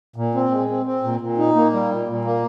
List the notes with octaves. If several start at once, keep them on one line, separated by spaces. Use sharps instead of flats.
A#2
C4
G#3
C4
C4
A#2
A#2
D#4
A#3
G3
A#2
A#2
A#3